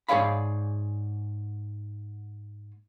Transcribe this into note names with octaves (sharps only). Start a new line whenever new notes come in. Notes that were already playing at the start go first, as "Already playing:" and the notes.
G#2 G#4 C#5 D5 F5 B5